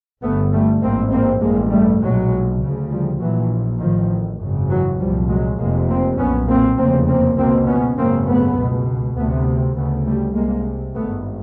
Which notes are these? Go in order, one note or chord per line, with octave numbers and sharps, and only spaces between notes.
G1 G2 A3 B3
G3 A3
A1 G#2 A#3 C4
A#3 C4
A1 G2 G#3 A#3
G3 A3
B1 A#2 F#3 G#3
D2 C#3
F3 G3
A#1 A#2 E3 F#3
A1 A2 D#3 F3
G#1 F#2 C#3
E3 F#3
C2 A#2 F3 G3
F#3 G#3
F1 F2 C3 G#3 A#3
A#3 C4
B1 A#2 B3 C#4
A#3 C4
F1 E2 C#3 A#3 C4
A#3 C4
C#2 B2 A#3 C4
B3 C#4
G#1 F#2 C#3 A#3 C4
A3 B3
C#2 B2
D2 C3 A3 B3
D2 C#3 A3 B3
G3 A3
C2 C3 G#3 A#3
G#1 G2 A3 B3